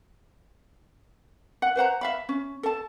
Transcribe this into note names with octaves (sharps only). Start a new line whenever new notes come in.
F#5
B4 C5 F#5 A#5
E5 F5 B5
C#4
A4 A5